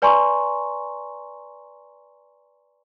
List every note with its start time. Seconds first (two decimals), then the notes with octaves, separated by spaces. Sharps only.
0.02 B4 D5 G#5 A#5 C6 C#6